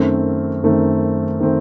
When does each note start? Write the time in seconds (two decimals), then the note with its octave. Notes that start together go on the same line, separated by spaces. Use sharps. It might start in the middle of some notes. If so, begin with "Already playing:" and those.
Already playing: F#2 D#3 A3 C4
0.64 F#2 D#3 A3 C4
1.40 D#3 A3 C4